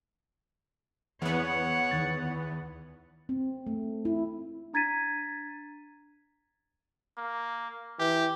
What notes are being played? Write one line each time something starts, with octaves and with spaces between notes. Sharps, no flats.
E2 E3 B3 C#5 F#5
D2 D#3 A6
C4
A3
E4
D4 A#5 G#6 A6 B6 D#7
A#3
E3 G4